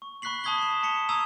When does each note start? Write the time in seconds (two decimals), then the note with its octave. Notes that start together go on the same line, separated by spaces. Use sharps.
0.02 C#6
0.22 B5 C#6 F#6 B6 C7 F#7
0.44 A5 B5 D#6 G#6 B6 G7
0.58 C7 E7
0.83 A5 B6 C#7 F7 G7
1.09 A#5 D#6 E6 G#6 D#7 F7